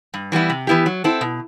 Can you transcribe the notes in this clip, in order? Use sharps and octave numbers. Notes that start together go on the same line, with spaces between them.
G2
E3 G3 B3 E4
C3
E3 B3 E4 G4
F#3
C4 E4 A4
B2